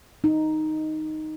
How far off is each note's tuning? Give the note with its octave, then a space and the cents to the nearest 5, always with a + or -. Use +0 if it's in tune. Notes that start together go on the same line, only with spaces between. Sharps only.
D#4 +0